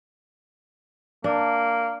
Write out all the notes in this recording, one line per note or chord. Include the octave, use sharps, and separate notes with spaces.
A#3 D4